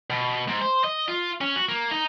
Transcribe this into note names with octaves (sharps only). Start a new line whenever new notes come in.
B2
G#2
C5
D#5
F4
C#4
F#4
A#3
D#4